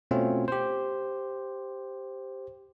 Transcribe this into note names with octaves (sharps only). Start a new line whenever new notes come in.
B2 A3 C4 C#4 F4
G4 C5